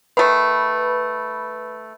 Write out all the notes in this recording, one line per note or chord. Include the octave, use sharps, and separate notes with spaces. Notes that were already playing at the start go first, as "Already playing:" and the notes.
D#3 A3 B4 B5